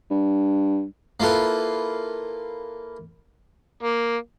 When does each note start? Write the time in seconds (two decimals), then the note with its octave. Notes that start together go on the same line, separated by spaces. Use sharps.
0.10 G2
1.20 A#3 E4 F4 A4 B4
3.83 A#3